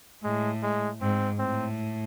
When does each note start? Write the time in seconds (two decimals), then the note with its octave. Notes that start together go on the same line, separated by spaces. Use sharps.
0.24 A2 G#3
0.62 G#3
1.01 G#2 C4
1.39 A2 C4